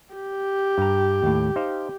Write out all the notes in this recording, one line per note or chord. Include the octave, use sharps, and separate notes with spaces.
G4
G2 A#5
D#2 A2
D#4 C5 F5